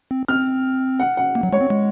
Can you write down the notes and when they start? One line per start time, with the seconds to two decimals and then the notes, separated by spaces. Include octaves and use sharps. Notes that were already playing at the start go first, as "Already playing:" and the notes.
0.11 C4
0.28 C4 F6
1.00 F#5
1.17 F#5
1.35 A#3
1.43 F#3
1.53 G#3 C#5
1.61 C4
1.70 G#3